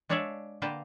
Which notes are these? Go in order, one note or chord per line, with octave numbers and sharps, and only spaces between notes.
G#3 D4 C#5 D5 E5 F5
D3 A#3 B4 F5 G5 A5